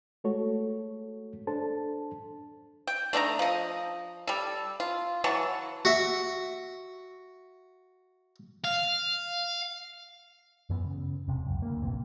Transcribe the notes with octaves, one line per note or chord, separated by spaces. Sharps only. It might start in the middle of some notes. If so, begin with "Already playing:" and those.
G#3 A3 F#4 A4 C#5
D4 A4 C5 A5
G5
A3 D4 D#4 A#5
F3 D#5
G3 A4
F4
E3 F#3 A5 C#6
F#4 E5
F5
F#2 E3 B3
C#3
E1 C3
C#2 F#2
D2 A#3
F1 A#1 C3 E3